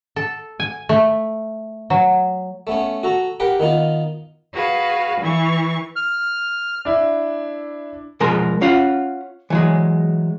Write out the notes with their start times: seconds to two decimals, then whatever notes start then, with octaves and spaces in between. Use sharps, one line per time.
0.16 A4
0.60 G#5
0.89 A3
1.90 F#3
2.67 A3 B3 C#4
3.03 F#4 A4 A#5
3.40 G4 A#4 B4 F#5 G5
3.60 D#3 B3 D#4 F4
4.53 F#4 G#4 B4 F5
5.20 E3 C#6
5.96 F6
6.85 D4 E4
8.20 B2 F3 G#3 A#4 A#5 C6
8.61 C#4 F4 F5 F#5
9.50 E3 F#3 G#3